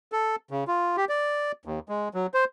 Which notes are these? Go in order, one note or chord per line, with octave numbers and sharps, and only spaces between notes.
A4
C#3
F4
G4
D5
D#2
G#3
F#3
C5